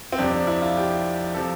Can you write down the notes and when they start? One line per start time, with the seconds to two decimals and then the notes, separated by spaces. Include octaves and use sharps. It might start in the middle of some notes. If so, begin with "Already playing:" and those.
0.13 C4
0.18 F2 C3 F3 D4
0.33 D4
0.47 E4
0.62 F4
0.77 G4
1.34 C3 F3 A4